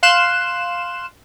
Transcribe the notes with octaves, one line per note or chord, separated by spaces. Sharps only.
F5 C6 F#6 E7